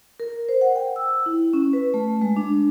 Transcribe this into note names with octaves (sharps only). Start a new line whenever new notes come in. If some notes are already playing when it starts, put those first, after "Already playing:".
A#4
C5
F#5
G5
E6
E4
C#4
B4
A3
G#3
D4